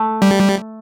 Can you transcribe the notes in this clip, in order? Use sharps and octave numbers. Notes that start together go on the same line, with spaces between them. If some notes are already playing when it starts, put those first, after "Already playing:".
Already playing: A3
G3